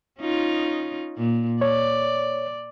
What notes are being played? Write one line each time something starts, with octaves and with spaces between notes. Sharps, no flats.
C#4 D#4 F4
A#2
C#5 D5